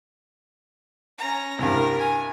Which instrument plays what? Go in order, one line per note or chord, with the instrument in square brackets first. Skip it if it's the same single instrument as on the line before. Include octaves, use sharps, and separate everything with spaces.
[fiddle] C#4 A#5
[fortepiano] C2 G2 [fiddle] A#4
[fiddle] G#5